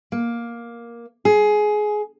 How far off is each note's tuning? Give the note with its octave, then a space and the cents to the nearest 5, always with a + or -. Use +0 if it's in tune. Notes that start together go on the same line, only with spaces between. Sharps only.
A#3 +10
G#4 +20